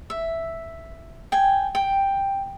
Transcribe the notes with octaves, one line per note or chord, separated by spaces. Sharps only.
E5
G5 G#5
G5